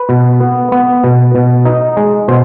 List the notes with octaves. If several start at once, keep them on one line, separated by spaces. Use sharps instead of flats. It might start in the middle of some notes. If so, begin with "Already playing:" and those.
Already playing: B4
B2
B3
B3
B2
B2
D#4
G#3
B2 C5